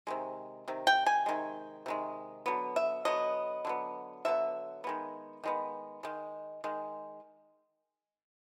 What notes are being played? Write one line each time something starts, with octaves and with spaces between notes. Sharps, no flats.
C3 D#3 G#3
C3 D#3
G5
G#5
C3 D#3 G#3
C3 D#3 G#3
D3 F#3 B3
E5
D3 F#3 B3 D#5
D3 F#3 B3
D3 F#3 B3 E5
D#3 G#3 B3
D#3 G#3 B3
D#3 G#3
D#3 G#3